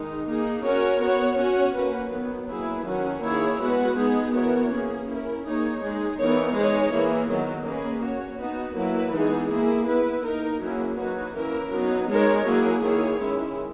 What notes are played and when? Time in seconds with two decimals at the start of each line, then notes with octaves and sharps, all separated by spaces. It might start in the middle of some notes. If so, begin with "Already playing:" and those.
Already playing: D#3 G#3 D#4
0.28 A#3 D#4 G#4
0.65 C#4 F#4 A#4 C#5
1.01 B3 F#4 C#5
1.38 C#4 F#4 C#5
1.75 A#3 C#4 F#4 B4
2.12 D#3 F#3 B3
2.49 F#3 A#3 E4 G#4 B4
2.86 D#3 F#3 C#4 F#4
3.23 D#3 A#3 E4 G#4 C#5
3.60 G#3 B3 F#4 B4
3.97 G#3 B3 D#4 G#4
4.34 E3 B3 F#4 A#4 C#5
4.71 A#3 C#4 G#4
5.08 C#4 E4 A#4
5.45 A#3 D#4 G#4 C#5
5.82 G#3 D#4 G#4
6.19 E3 B3 D#4 A#4 C#5
6.56 G#3 D#4 G#4 C#5
6.93 E3 A#3 E4 G#4
7.30 D#3 F#3 B3
7.66 A#3 C#4 G#4 B4
8.03 C#4 F#4 C#5
8.41 B3 D#4 F#4 B4
8.77 F#3 A#3 E4 B4
9.14 E3 G#3 B3 D#4 G#4
9.52 A#3 E4 G#4
9.88 B3 E4 B4
10.25 A#3 D#4 A#4
10.62 F#3 A#3 C#4 E4 G#4
10.99 F#3 A#3 D#4 F#4 B4
11.36 E3 A#3 C#4 E4 A#4
11.73 F#3 B3 D#4
12.10 G#3 D#4 A#4 C#5
12.47 F#3 A#3 E4 G#4
12.83 D#3 A#3 E4 G#4 C#5
13.21 D#3 G#3 C#4 E4